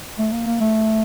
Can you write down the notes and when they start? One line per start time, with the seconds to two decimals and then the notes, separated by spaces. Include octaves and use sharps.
0.18 A3
0.32 A#3
0.46 A#3
0.61 A3